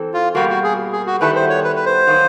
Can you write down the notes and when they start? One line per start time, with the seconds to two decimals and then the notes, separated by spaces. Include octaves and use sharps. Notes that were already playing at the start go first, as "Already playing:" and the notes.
Already playing: E3 C4 A4
0.14 F4
0.35 B2 G3 A#3 F#4
0.49 F#4
0.63 G#4
0.92 G#4
1.06 F#4
1.20 D#3 G3 B3 E4 A4 B4
1.35 C5
1.50 C#5
1.64 B4
1.76 B4
1.86 C5
2.07 D#3 F#3 A#3 D#4